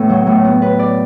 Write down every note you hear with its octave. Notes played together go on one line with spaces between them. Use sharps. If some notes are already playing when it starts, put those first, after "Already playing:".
Already playing: A2 B3
F#3
A2
B3
B4
D5